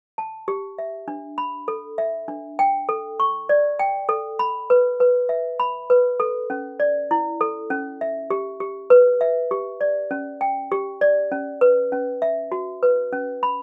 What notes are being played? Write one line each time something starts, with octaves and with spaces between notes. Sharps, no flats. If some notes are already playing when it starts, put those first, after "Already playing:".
A5
G4
E5
D4
B5
A4
E5
D4
G5
A4
C#6
D5
G5
A4
B5
B4
B4
E5
B5
B4
A4
C#4
D5
E4
A4
C#4
E5
G4
G4
B4
E5
G4
D5
C#4
G5
G4
D5
C#4
B4
C#4
E5
F#4
B4
C#4
B5